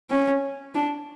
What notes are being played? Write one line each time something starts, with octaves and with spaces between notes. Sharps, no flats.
C#4
D4